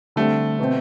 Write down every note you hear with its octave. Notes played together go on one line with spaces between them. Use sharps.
D3 G3 A3 C4
B2 A3 C4